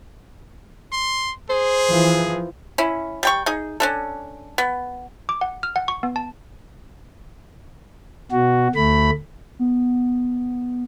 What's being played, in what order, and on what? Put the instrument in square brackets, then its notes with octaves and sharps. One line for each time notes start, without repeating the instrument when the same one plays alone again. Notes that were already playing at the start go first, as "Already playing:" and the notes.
[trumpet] C6
[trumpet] G#4 [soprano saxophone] C5
[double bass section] E3 F3
[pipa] C#4 E4
G3 G5 C#6
D#4 G#4
C#4 D4 A4
B3
[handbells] D6
F#5
F6
F#5
C#6
B3
A5
[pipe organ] B2 F#4
D2 A3 B5
[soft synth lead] B3